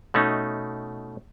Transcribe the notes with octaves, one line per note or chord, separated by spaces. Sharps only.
B2 A3 C#4 D#4